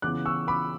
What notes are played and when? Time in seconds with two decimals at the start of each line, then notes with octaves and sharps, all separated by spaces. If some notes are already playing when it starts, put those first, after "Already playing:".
0.02 C#3 E3 B3 D6 F#6
0.25 C#6 E6
0.48 B5 D6